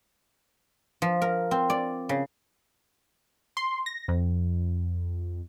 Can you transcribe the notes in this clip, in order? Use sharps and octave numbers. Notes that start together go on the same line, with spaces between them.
F3
A#4
C4
D5
C#3
C6
A#6
F2